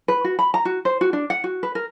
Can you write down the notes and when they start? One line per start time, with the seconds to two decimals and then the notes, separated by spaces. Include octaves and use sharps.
0.08 B4
0.24 F#4
0.39 B5
0.54 A#5
0.65 F#4
0.85 C5
1.01 F#4
1.13 D4
1.30 F#5
1.44 F#4
1.63 B4
1.75 A#4